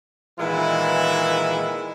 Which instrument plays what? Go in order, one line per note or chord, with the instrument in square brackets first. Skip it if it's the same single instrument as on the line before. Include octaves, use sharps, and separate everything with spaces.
[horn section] A#2 D#3 E3 G#3 B3 E4